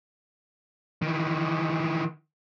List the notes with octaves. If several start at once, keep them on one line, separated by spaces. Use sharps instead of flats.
D#3 E3